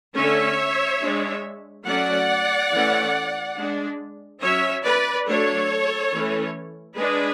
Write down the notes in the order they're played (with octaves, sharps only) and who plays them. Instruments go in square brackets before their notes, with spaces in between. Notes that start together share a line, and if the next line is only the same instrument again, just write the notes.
[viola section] D3 A3 C#4 C#5 E5
G#3 D4
F#3 A3 C#4 D5 F#5
E3 A3 C#4
G#3 D4
F#3 C#4 C#5 E5
B4 D5
F#3 A3 D4 A4 C#5
E3 A3 C#4
G#3 D4 G#4 B4